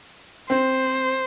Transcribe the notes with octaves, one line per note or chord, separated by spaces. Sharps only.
C4 C5